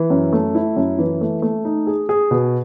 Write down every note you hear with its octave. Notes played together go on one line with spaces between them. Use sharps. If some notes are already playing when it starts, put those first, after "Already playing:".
Already playing: E3
F#2
A3
E4
F#2
E3
A3
A3
D#4
G#4
G#4
B2